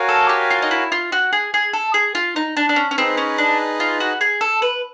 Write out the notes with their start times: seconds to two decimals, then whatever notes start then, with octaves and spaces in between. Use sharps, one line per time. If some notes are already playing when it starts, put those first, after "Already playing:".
Already playing: F#4 A#4 C#5 F5 G#5
0.09 A4
0.29 G4
0.50 F4
0.62 D#4
0.71 E4
0.92 F4
1.12 F#4
1.33 G#4
1.54 G#4
1.73 A4
1.94 G#4
2.15 F4
2.36 D#4
2.57 D4
2.69 D4
2.76 C#4
2.91 C#4
2.97 C4 D#4 G#4 B4
3.17 C#4
3.38 D4
3.80 F4
4.00 F#4
4.21 G#4
4.41 A4
4.62 B4